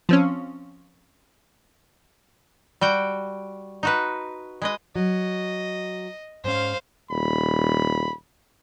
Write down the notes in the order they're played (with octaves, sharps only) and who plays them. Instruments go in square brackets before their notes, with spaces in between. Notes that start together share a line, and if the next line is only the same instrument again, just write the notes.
[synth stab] F3 C4 C#4
[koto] G3 F#4 G5
D#4 F#4 B4
G#3 B4 D#5
[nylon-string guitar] F#3 [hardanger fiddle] D#5
[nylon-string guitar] G#2 C#4 [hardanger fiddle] C5 F5
[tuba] D#1 [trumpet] B5